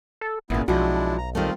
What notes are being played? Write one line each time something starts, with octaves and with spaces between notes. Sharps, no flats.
A4
G#1 A#2 C#3 B3 E4
B1 F3 G#3 D4 E4 F#4
A#5
D#3 G3 A3 C4 F4